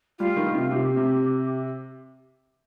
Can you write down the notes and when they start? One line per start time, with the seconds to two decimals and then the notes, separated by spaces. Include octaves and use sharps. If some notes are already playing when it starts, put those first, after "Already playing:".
0.19 G3 F4
0.36 D#3
0.47 D#3
0.54 C3
0.71 C3 G4
0.97 C3